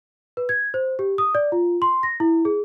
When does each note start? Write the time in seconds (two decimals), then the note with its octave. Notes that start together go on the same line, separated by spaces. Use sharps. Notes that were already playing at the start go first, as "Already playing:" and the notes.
0.37 B4
0.49 G#6
0.74 C5
0.99 G4
1.18 D#6
1.35 D5
1.52 F4
1.82 C6
2.03 A#6
2.20 E4
2.45 G#4